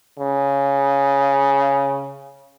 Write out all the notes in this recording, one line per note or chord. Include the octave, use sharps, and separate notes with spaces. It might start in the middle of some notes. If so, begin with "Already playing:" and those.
C#3